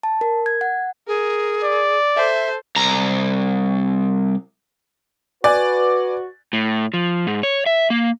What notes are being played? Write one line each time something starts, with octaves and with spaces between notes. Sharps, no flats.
A5
A#4
G#6
F#5
G#4 A#4
D5
A4 C5 E5
C2 A#5
F#4 B4 D5 G#5 F#6 A6
A2
F3
G#2
C#5
E5
A#3